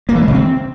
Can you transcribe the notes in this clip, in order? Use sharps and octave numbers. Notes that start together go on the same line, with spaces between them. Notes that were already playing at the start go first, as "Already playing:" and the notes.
A#3
E3
G#3
C#3
C4